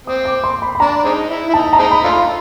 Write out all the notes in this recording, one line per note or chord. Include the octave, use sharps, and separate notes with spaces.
C4 D#6
D6
C6
B5
B5
D4 A#5
G#3 C4 D#4
E4
E4
D#4 A5
A#5
G#3 C4 D#4
B5
A3 D4 F4
C6